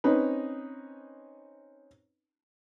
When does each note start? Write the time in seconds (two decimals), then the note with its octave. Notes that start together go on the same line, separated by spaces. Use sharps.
0.04 C4 C#4 D#4 B4